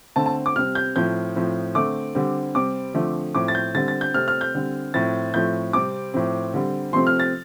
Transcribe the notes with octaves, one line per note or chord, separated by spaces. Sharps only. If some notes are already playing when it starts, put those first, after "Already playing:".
D3 A3 C4 A5
A5
D6
C3 G3 C4 F6
G6
A2 F3 C4 G6
A2 F3 C4
D3 A3 C4 D6
D3 G3 C4
C3 G3 C4 D6
D3 F3 A3 C4
A2 F3 C4 D6
A6
G6
D3 G3 C4 A6
A6
G6
C3 A3 C4 F6
F6
G6
D3 G3 C4
A2 F3 C4 A6
A2 F3 A3 C4 G6
C3 G3 C4 D6
A2 F3 C4
D3 G3 C4
C3 F3 A3 C4 C6
F6
A6